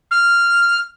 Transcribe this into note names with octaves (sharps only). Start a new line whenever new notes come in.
F6